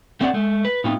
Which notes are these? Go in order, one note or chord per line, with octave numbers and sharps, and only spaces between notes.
A3 C4 D4 C#5 D5 F#5
G#3 A3
B4
A2 B3 C4 D#4 F4